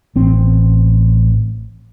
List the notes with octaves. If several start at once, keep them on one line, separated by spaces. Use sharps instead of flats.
A1 C4